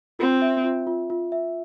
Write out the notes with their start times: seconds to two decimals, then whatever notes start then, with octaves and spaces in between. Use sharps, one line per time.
0.19 C4 F4
0.42 E5
0.64 F4
0.87 F4
1.10 F4
1.32 E5